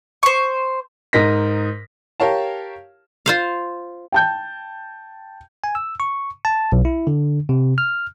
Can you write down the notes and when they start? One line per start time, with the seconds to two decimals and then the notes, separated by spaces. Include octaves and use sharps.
0.23 C5 C#6
1.13 G#2 A#4 D#5 A#6 B6
2.20 G4 A#4 C#5 F5 A5
3.26 F4 C5 F5
4.12 G5 A5 G6
5.64 G#5
5.75 E6
6.00 C#6
6.45 A5
6.72 B1
6.85 E4
7.07 D3
7.49 C3
7.78 F6